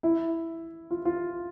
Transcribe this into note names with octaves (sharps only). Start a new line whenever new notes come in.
E4
F4
F4